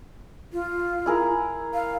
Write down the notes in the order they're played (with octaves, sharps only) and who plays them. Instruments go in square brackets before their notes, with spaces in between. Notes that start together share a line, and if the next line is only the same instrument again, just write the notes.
[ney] F4
[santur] E4 G#4 A#4
[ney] F5